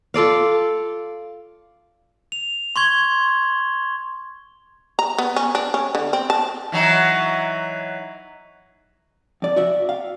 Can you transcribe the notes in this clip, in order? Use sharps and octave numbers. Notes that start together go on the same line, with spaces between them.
F4 A4 D5 F5
F7
C6 C#6 G#6 G7
A#5
B3
C#4
D4
C#4
D3
C4
A5
E3 F#3 D#4
F2 D5
F#4 D5 E5
F5